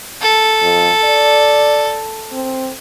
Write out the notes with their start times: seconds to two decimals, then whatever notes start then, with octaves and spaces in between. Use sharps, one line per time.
0.22 A4
0.62 F2
1.04 D5
2.33 C4